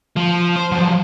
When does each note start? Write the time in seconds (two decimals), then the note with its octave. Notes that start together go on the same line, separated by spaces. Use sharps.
0.16 F3
0.56 C5
0.72 F3 F#3